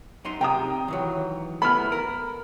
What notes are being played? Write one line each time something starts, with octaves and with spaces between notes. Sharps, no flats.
F#2 D#4 C6
C3 G5 A#5 D#6
D#3 E3 F#3
A3 B3 E4 B5 F6
A#4